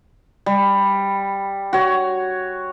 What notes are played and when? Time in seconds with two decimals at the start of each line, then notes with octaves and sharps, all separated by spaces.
0.46 G3
1.73 F#4 C#5